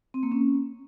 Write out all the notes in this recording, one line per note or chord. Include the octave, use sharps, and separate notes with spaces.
C4
A#3
C#4